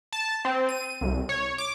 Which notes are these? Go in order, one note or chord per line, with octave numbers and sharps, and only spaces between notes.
A5
C4
D#7
C2
C#5
D6